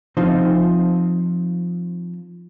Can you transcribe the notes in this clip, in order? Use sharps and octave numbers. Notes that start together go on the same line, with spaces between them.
F3 C4 D#4 F4 C5